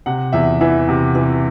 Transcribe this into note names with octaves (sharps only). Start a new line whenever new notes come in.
C3 F#5
E2 E5
E3 E5
C3
E3